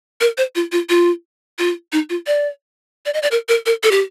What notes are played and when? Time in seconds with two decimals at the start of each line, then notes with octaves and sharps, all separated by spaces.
0.21 A#4
0.38 C5
0.55 F4
0.72 F4
0.89 F4
1.59 F4
1.92 D#4
2.10 F4
2.27 D5
3.06 D5
3.14 D#5
3.23 D5
3.31 A#4
3.49 A#4
3.66 A#4
3.83 A4
3.91 G4